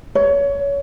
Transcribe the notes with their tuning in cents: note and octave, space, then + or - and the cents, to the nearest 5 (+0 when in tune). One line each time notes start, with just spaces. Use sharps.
C#5 +20